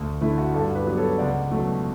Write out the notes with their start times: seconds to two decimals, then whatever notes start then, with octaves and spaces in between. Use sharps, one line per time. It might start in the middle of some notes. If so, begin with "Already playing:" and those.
Already playing: D2
0.21 D3 A3 E4
0.38 F#4
0.54 G2 F#4 A4
0.75 G4 B4
0.86 F#3 B3
0.97 A4 C#5
1.18 C#2 D5 F#5
1.51 B2 F#3 A3